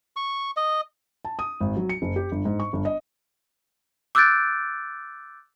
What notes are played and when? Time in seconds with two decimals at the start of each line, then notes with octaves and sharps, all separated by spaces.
0.16 C#6
0.57 D#5
1.25 A5
1.39 D#6
1.61 G#1
1.77 F#3
1.89 C#7
2.02 F#1
2.16 G4
2.32 G1
2.45 G#2
2.60 C#6
2.73 G1
2.85 D#5
4.15 D6 E6 F#6 G6 A6 D7